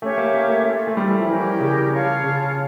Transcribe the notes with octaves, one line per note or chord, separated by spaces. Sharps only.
A3 C#4 G4 C#5 E5
A#3
A#3
A3
C#4 F4 A4 E5
A3
G3
E3
F3
E3 C#4 G4 A#4 D5
C#3
F4 C#5 F5 A5
C#3